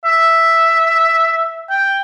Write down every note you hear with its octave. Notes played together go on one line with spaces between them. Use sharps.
E5
G5